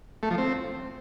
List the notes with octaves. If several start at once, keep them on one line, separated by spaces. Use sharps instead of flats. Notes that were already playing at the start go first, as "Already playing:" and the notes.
A3
F3
C4